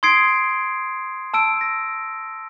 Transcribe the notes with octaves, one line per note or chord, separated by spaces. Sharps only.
C6 D#6 G#6 C7 D7
A5 E6 D7
A#6